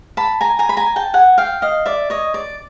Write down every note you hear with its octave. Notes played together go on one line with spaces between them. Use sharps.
A5 B5
G#5 A#5
G#5 A#5
B5
G#5 A#5
G5 A5
F#5 G#5
F5 G5
D#5 F5
D5 E5
C#5 D#5
D5